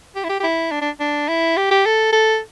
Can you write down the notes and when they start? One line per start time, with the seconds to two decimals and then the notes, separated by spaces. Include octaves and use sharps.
0.16 G4
0.24 E4
0.29 G4
0.40 G4
0.43 E4
0.71 D4
0.82 D4
1.00 D4
1.28 E4
1.57 G4
1.71 G4
1.85 A4
2.13 A4